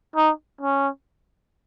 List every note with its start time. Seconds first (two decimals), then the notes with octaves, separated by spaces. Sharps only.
0.16 D#4
0.61 C#4